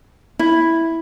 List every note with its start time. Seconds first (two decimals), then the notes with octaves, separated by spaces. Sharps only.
0.39 E4